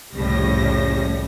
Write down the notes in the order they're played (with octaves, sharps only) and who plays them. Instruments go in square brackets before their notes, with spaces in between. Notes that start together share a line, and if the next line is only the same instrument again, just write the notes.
[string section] C2 F2 A2 C#3 G3 A#6